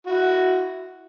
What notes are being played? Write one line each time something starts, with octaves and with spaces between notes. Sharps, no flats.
E4 F#4